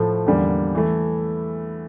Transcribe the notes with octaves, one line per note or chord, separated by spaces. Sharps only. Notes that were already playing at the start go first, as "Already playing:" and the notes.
Already playing: A2 F3 A3
E2 D3 G3 A#3
E3 A3